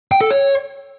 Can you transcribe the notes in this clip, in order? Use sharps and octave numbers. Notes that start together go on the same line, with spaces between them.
G5
A4
C#5